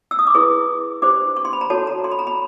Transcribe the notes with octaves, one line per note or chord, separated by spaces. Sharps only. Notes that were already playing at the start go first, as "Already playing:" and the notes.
E6
D#6
D6
E4 G#4 B4 C#6
D4 G4 C5 D6
C#6
C6
B5
A#5
F#4 A4 C#5 A5
A#5
C6
B5
A#5
B5